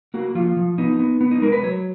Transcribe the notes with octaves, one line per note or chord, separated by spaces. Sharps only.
A#3 F#4
F3 F4
F3
B3 D#4
B3
B3
D#4
G#3 A#4
B4
F#3 C#5